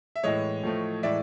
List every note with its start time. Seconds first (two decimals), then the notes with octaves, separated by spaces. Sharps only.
0.16 E5
0.23 A2 E3 G#3 C#5 D#5
0.63 A2 F3 A3
1.03 A2 E3 G#3 D5 E5